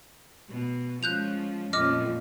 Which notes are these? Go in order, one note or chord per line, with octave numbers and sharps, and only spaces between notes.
B2
F3 G#3 C#4 F#6 G6 F7
F2 A#2 C#4 D#5 D6 F6